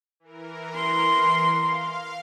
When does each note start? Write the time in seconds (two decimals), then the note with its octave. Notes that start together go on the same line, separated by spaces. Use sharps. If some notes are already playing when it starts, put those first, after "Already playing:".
0.20 E3 A#4
0.76 C6
1.52 F5